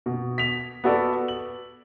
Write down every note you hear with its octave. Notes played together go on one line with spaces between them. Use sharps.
B2
B6 F7
B3 F#4 A4 D5
F#7